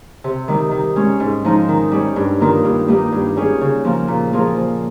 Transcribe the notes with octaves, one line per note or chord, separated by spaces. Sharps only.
C3
D#3 G3
D#3
G#3 C#4
G#2
F3 G#3 D#4
D#3
G3 C#4
G2
D#3 A#3 F4
G2
G3 A#3 D#4 G4
G2
G3 C#4 G#4
C#3
F3 A#3
A#2
F3 A#3 F4 G#4
F3